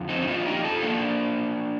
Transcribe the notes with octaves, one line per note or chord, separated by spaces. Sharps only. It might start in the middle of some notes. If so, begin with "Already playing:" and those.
Already playing: F2 D3 F3
C4 D#4
D#4
D4 F4
D#4 G4
F4 A4
A#3 D4